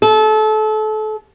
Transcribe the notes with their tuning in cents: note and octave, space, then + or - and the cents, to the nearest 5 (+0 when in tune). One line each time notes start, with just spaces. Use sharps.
A4 -30